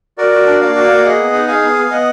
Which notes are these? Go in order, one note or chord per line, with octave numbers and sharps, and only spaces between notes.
F#4 A#4 D5
F#4
D4
A#3 D5 F5
F#4
A#3
G#4 D#5 F#5
B3
D#4
G#4 F5 G#5
B3
B3
B3 D#5 F#5